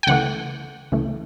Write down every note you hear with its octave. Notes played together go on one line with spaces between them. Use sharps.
G5
C#2 C#3 E3 A3 F#5
C#2 C#3 E3 A3